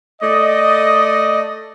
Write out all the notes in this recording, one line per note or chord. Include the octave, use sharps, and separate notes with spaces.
A3 D5 D#5